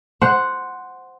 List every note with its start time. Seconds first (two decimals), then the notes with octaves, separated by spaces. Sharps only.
0.22 C5 F#5